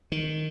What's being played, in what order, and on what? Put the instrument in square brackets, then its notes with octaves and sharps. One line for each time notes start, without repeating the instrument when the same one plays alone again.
[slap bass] D#3